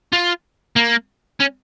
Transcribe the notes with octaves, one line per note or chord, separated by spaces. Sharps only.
F4
A#3
C#4